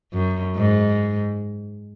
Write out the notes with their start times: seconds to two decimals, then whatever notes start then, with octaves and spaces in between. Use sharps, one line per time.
0.13 F#2
0.56 G#2